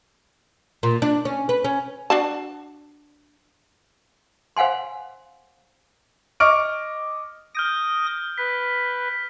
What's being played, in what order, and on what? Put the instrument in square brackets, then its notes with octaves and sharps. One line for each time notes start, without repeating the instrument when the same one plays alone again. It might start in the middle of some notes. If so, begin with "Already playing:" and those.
[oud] A#2
D4
C#4
B4
C#4
[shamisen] D4 F#4 A5
[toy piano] C5 F5 F#5 G#5 C6
[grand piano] D#5 C#6 D6 F6 D7
[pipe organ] D#6 A#6 [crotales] F6 G6 D7
[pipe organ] B4 [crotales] B6